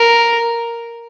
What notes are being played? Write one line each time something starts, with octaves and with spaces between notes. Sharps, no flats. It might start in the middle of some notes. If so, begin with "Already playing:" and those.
Already playing: A#4